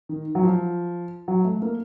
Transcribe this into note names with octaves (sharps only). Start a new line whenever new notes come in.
D#3
F#3
F3
F#3
A3
A#3